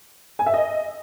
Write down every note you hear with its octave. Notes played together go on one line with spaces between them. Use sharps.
G#5
E5
D#5